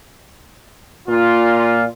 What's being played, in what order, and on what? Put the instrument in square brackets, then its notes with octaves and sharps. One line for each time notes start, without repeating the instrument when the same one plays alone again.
[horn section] A#2 F4